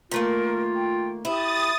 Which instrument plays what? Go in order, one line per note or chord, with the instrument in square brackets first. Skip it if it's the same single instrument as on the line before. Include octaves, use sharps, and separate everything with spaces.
[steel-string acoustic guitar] D#3 A3 A#3 [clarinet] F4 [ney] A#4
[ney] G5
[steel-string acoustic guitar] E4 [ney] G4 [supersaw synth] D#6 A6